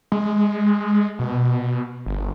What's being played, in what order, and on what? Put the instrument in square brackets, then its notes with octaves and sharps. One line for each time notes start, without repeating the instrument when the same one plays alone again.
[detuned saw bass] G#3
B2
G1